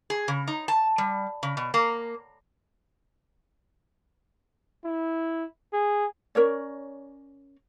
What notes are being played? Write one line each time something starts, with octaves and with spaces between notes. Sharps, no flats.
G#4
C#3
D#4
A5
G3
C#3
B2
A#3
E4
G#4
C#4 A#4 C#5 D5